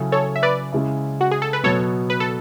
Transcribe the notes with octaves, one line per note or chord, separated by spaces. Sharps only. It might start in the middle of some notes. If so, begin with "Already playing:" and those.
Already playing: C#3 F#3 C#4 E4 A4
A4 C#5
E5
B4 D5
C#3 G#3 C#4 E4
F#4
G#4
A4
B4
B2 F#3 B3 A4 C#5
B4
A4